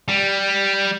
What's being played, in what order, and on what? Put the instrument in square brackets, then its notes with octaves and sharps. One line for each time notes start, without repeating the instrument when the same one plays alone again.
[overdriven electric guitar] G3